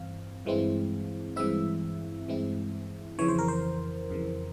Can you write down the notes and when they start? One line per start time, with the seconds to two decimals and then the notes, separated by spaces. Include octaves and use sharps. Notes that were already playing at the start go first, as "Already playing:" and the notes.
Already playing: G2 E3 C4 F5
0.45 G2 E3 G#3 C4 E4
1.36 G2 E3 G#3 C4 E4 E5
2.28 G2 E3 G#3 C4 E4
3.19 F2 C#3 E3 C#5
3.28 C5
3.39 A#4
3.48 C5
4.10 F2 C#3 E3